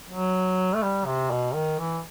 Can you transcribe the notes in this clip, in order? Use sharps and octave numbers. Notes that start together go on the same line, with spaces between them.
F#3
A3
G3
C3
B2
D#3
E3